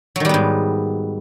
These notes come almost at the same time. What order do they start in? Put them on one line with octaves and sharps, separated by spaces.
F#3 D#3 G3 B3 G#2